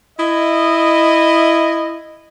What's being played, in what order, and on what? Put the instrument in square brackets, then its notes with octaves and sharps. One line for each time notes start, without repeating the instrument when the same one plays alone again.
[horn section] E4 D#5